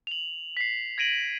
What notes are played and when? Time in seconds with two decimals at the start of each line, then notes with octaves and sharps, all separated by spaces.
0.07 F7 F#7
0.57 B6 C7
0.98 G#6 A#6 D7 D#7 F#7